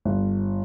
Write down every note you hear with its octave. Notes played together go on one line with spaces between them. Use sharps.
G1